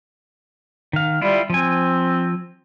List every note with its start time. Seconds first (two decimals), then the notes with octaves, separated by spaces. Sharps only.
0.93 D#3 F5
1.22 G3 E4 F4
1.50 F3 C4 G#5